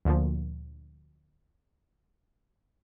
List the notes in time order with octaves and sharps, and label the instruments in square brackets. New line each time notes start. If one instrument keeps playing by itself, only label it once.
[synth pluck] D2 A#2 F3